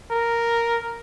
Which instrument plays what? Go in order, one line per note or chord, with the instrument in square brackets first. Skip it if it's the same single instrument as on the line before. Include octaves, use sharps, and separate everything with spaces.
[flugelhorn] A#4